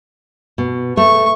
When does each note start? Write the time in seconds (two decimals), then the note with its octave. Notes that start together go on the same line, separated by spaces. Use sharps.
0.58 B2
0.97 A3 C#6